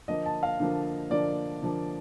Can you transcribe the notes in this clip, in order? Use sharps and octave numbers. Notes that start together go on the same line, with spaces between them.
D3 F3 A#3 D#5
A5
F5
D3 F3 A#3
D3 F3 A#3 D5
D3 F3 A#3